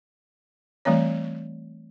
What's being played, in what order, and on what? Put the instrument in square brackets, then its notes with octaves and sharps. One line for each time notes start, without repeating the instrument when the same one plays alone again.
[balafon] E3 G3 A3 C4 C#5